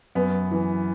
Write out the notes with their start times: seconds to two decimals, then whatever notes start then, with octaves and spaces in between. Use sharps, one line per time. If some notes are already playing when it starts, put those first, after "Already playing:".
0.15 F#2 B3
0.51 E3